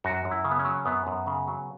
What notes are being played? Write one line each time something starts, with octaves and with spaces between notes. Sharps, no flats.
F#2 F#4
F#2
E4
C#3
B3
C#4
F#3
F#2 B3
F#2
C#3
F#3